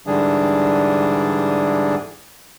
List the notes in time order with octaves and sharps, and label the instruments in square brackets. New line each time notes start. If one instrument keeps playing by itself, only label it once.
[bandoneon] G#2 D3 E3 G3 D4 G#4